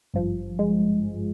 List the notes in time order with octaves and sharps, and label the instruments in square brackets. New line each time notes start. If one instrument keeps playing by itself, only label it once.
[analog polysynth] G#1 G2 F3
G#3